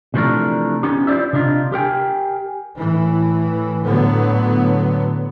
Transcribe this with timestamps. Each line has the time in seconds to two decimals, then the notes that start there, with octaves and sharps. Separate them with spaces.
0.14 C3 E3 F3 A3 D4 A#4
0.83 B3 C#4 D#4 G4
1.07 E4 F4 C5 D5 E5
1.33 C3 D4 D#4 F4
1.72 G4 A#4 G5 G#5
2.77 A2 E3
3.83 A2 D3 F#3 B3